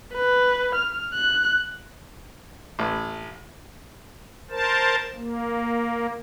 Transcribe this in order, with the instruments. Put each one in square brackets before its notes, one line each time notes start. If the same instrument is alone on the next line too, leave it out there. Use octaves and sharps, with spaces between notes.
[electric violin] B4
F6
F#6
[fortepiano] A1
[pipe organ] A#4 C5 A5
A#3